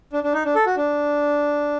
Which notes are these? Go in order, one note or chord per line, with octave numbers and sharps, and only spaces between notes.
D4
D4
D#4
D4
A4
F#4
D4